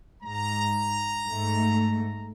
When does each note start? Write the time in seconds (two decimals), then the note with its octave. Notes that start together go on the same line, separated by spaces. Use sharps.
0.23 G#2 A#5
1.28 G#2 A3